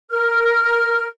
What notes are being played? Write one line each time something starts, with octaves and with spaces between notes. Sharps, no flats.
A#4 F6